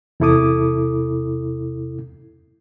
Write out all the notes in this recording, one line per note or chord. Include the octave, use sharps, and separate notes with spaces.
E2 C3 E4 A4 D6 D#6